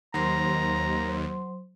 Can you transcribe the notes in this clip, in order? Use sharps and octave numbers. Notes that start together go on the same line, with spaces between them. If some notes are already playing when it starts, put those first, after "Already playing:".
D#2 F#3 C5 A#5 C6